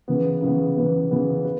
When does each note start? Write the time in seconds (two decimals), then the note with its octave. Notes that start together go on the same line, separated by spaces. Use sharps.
0.08 C#3 E3 B3
0.42 C#3 E3 B3
0.76 C#3 E3 B3
1.11 C#3 E3 B3
1.45 B4